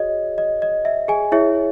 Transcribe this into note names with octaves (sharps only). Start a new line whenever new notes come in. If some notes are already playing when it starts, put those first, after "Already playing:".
Already playing: F#4 G#4 C#5 D#5
D#5
D#5
E5
G#4 G#5
E4 G#4 C#5 E5